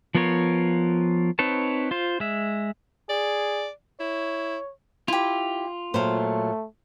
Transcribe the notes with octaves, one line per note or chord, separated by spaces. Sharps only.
F3 B3 F4 A#4 C#5
C4 D#4 B4 C#5 A5
F4 C5
G#3 E5
G#4 D5
E4 C#5
E4 F4 G4
A#2 F#3 A3 C5 F5